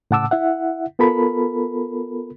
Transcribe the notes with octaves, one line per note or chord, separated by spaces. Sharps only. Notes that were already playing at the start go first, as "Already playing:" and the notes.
A2 C#3 F#5 A5 D6 E6
E4 E5 F#5
B3 F4 A4 A#4 B5